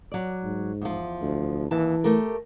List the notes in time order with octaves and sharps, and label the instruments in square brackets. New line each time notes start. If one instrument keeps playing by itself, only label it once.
[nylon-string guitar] F#3 D5
[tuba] G#2
[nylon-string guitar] E2 F3
[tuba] D2
[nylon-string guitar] D#2 A5 [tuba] E3
[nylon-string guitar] A3 G4 A#4